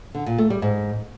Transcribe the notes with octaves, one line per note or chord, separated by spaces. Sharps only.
D3
A#2
A3
G3
G#2